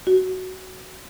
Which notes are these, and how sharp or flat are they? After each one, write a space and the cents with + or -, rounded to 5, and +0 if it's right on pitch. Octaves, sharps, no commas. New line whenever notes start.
F#4 +15